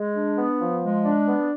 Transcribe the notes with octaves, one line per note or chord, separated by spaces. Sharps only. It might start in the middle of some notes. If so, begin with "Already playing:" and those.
Already playing: G#3
D4
B3
F3
G#3
D4
B3